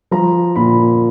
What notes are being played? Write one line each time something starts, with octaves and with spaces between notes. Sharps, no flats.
F3 A#5
A#2 B5